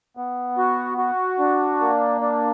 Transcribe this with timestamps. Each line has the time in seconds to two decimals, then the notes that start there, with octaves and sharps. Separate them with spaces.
0.17 B3
0.58 F#4
0.98 F#4
1.39 D4
1.80 A#3
2.21 D4